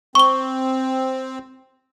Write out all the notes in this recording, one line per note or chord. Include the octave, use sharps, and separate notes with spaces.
C4 C#6 G7